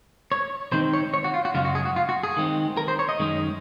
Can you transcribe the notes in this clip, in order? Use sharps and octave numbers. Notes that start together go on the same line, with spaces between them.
C#5
D#3 G#3 C4 D#4 C5
C#5
C#5
F#4
F4
F#4
F#2 C#3 G#3 C#4 F4
F#4
G#4
F#4
F4
F#4
G#4
D#3 G#3 C4
A#4
C5
C#5
D#5
F#2 D#3 G#3 C#4